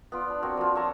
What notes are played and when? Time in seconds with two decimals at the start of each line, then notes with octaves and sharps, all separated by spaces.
0.12 B3 F4 D5
0.30 D4
0.42 A#3 C4 F#4
0.57 F3 F4
0.75 C#5 E5 A5 A#5